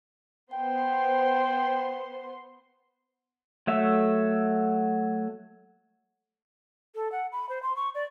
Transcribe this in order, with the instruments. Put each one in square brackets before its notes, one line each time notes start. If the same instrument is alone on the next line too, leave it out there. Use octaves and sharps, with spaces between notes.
[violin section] B3 C5 C6 [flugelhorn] G5
[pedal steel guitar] F#3 A3 E5
[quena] A4
F#5
B5
C5
C6
C#6
D5